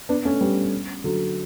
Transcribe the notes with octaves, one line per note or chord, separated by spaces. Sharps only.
B3 D4
A3 C#4
G3 B3
D3 F#3